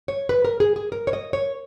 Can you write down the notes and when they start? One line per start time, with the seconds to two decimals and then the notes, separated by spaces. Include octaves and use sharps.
0.08 C#5
0.29 B4
0.45 A#4
0.60 G#4
0.76 G#4
0.92 A#4
1.07 C#5
1.13 D#5
1.33 C#5